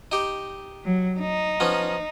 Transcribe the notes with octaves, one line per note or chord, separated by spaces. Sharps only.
D#4 G4
F#3
D#4
F3 B3 C#4